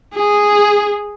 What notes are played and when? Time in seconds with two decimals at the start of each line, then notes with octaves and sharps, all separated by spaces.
0.14 G#4